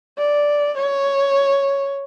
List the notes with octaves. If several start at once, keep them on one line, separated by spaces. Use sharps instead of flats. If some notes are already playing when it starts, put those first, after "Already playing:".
D5
C#5